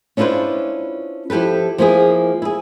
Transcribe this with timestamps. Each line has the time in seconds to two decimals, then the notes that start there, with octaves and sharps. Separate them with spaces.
0.17 C#4 D4 E4 F4 B4 C5
1.30 F3 E4 G4 A4 B4
1.78 F3 A#3 E4 G#4
2.42 E4 G#4